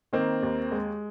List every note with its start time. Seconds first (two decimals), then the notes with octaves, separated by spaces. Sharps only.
0.13 D#3 A#3 C4
0.43 D#2
0.71 G#3